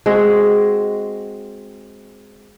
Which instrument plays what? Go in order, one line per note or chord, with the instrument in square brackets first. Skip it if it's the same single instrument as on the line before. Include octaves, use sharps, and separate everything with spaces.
[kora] G#3 C4 F#4